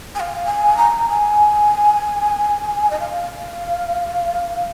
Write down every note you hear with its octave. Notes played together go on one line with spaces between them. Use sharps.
G#5
F5
G#5
A#5
G#5
D#5
F5